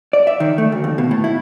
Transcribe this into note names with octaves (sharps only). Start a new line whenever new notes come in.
D5
E5
D#3
A3
D2
D#2
B2
A2
E4